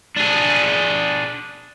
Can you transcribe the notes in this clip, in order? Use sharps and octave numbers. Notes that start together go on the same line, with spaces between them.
D4 G#4